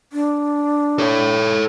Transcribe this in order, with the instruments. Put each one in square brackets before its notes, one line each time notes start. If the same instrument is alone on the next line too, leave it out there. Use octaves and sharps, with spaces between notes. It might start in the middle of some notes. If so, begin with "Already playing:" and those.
[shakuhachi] D4
[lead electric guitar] A4 C#5